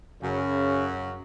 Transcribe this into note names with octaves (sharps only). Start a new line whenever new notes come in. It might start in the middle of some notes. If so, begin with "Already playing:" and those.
F#2 C#3